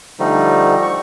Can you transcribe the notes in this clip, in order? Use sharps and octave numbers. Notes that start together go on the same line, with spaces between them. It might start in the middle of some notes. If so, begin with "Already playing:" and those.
D3 F3 G3 A3 D#4
C#6